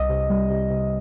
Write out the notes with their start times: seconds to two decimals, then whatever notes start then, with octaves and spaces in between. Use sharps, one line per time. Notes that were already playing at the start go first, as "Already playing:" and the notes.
Already playing: C2 D#5
0.09 C3
0.29 G3
0.50 C3
0.70 C3